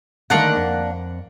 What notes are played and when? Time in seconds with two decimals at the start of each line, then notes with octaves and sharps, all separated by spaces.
0.30 D3 D#3 A3 A#3 D4 F#5
0.56 F2